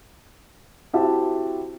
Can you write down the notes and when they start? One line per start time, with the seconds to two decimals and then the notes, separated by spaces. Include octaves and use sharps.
0.93 C4 E4 F#4 G4 E5 A5